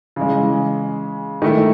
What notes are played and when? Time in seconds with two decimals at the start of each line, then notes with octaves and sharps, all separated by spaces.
0.16 C#3 E3 G#3
1.42 D#3 A3 E4